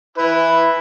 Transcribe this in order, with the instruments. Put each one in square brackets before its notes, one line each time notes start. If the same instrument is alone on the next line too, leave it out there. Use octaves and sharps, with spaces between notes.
[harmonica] E4 B4